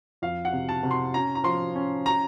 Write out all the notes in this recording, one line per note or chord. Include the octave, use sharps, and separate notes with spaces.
F2 F5
F#5
C3
A5
C3
C6
C#4 A#5
A#5
F3 C6
C#4
A#5